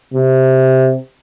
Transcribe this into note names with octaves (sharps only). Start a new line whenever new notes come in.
C3